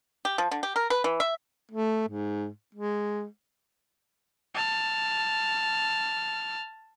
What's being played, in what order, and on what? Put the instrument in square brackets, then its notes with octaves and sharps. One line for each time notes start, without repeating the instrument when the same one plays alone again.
[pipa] G4
F3
D3
G4
A#4
B4
E3
E5
[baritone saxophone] A3
G#2
G#3
[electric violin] A5 F6